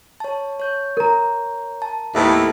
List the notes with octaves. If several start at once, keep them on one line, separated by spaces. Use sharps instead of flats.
C#5 A5
C#5 G6
A#4 A#5
A5
D#2 A2 B3 E5 A5